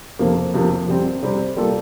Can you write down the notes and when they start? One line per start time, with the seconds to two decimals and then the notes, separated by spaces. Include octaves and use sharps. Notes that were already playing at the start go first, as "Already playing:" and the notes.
0.19 F2 C3 F3 A#3
0.54 F2 C3 F3 A#3
0.88 C3 G3 C4
1.22 C3 G3 C4
1.57 G3 A#3 F4 A4